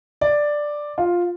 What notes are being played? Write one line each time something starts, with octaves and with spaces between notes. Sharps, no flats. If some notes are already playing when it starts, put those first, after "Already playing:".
D5
F4